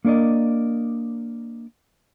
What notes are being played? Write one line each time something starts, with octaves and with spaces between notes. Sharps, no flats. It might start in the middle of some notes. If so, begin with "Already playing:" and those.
A#3 D4 A#4 D5 D#5